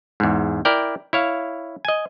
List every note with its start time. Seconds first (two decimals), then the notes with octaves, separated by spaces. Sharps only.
0.20 E2 G#2
0.65 E4 A#4 D5 G5
1.13 E4 C#5 F5
1.85 D#5 G#5